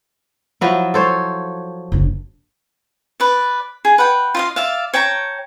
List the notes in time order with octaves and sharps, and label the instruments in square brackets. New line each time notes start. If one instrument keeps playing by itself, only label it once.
[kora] F3 F#3 E4
A4 C5 C#5
[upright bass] F#1 D4
[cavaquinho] B4 D5
G#4
B4 F#5 G5
F4 D#5 F5
D5 E5 F5
C#5 G5 A5 A#5